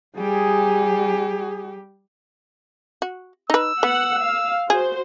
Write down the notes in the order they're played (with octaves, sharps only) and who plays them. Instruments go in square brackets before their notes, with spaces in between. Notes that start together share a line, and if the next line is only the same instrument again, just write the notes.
[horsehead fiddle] G3 G4 [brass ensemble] G#4
[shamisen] F#4
[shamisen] D#4 B4 [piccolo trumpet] E6
[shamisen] B3 [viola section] F#5
[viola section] F5
[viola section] F#4 C5 [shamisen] G#4